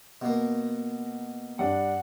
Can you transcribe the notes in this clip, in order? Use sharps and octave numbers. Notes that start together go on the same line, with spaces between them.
B2 A#3
G2 D4 F#5